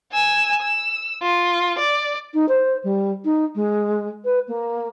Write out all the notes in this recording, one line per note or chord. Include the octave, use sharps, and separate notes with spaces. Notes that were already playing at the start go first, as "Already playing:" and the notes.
G#5 E6
E6
F4
D5
D#4
C5
G3
D#4
G#3
B4
A#3